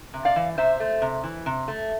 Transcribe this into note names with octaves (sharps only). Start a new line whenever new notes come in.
C3
D5 F5
E3
C3 C5 E5
A3
C3
E3
C3
A3